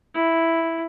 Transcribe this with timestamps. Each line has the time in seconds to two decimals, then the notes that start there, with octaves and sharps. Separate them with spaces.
0.14 E4